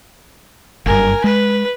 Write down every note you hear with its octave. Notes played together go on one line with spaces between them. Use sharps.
F#1 G2 A#4 G#5
G#3 B4